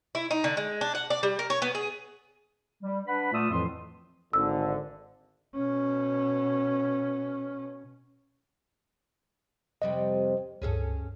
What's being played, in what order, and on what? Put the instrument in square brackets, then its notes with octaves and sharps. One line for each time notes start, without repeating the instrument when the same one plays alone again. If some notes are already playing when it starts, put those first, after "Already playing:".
[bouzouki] E4
D#4
D3
G#3
D4
F#5
D5
G3
A#4
C#5
B3
G#4
[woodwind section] G3
D4 B4 F#5 B5
A#2 A3 F4 D5 D#6 E6
F2 A2 E3 F3 C6
[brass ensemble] G#1 D3 [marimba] E6
[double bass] B2 C#4
[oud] F2 C3 G3 [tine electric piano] D#5
[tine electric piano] C#2 G2 [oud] C#4 G#4 A4